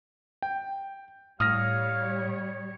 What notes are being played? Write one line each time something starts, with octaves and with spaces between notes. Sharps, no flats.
G5
A2 G3 C#5 F5 D#6 F6 A#6